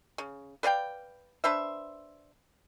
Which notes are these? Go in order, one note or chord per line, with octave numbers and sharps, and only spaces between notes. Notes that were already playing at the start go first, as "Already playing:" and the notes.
C#3
B4 D5 F5 G5
D4 B4 C5 E5